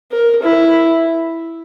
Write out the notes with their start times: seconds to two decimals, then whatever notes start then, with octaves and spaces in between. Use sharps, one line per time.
0.12 A#4
0.43 E4